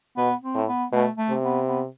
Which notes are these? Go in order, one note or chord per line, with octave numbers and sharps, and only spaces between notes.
B2 B3
C4
A2
B3
B2 A3
A3
C3
B3
B3